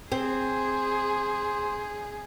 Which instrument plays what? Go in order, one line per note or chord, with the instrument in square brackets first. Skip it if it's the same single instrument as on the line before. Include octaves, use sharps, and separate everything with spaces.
[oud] C4 [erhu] G#4 [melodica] C5